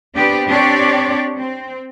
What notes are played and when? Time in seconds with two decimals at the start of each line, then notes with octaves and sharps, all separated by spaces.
0.15 B3 C4 D4 G4 B4
0.48 C4 D4 G4 C#5 D5
1.38 C4